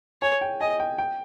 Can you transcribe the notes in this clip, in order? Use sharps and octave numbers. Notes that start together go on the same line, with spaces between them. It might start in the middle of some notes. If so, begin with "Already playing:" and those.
C#5 G#5
G5
D#5 G#5
G5
G5